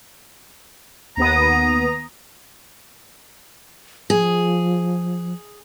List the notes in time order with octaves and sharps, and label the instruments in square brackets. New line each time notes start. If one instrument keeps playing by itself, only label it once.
[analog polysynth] D#2 B3 D#6 [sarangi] A#5
[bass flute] F3 [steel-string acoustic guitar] G#4